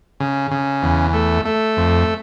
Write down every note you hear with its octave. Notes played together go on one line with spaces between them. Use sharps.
C#3
C#3
E2
A3
A3
F2